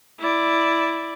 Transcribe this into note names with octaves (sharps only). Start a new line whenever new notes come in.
E4 D5